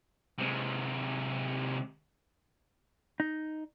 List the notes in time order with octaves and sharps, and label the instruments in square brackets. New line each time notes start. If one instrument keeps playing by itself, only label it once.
[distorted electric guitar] C3 G#3
[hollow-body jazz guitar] D#4